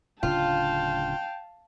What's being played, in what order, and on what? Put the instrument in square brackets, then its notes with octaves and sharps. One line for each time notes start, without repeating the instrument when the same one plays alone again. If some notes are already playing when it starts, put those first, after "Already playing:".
[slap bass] D1 C#3 D4 [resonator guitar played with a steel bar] F4 [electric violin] F5 A5 [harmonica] G5